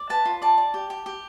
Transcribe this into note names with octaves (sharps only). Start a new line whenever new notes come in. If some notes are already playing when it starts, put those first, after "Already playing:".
Already playing: D5
B4 A5
F4
D5 A5
D5
G4
G4
G4